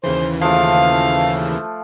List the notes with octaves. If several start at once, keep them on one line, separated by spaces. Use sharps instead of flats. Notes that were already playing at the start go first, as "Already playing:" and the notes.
D#2 C#3 E3 C5
F3 A3 F5